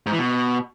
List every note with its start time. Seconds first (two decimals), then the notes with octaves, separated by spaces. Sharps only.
0.06 G#2
0.13 E3
0.19 B2